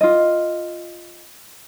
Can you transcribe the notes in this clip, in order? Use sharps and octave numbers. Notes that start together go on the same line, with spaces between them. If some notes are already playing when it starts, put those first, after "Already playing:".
F4 D#5